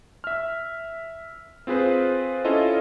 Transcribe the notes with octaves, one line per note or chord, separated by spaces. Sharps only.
E5 F6
C4 F4 G#4 B4 C5
C#4 E4 F4 A4 D#5